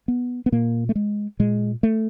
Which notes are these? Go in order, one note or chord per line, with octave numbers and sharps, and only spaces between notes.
B3
B3
A#2 A#3
A3
G#3
A#2 G#3
A3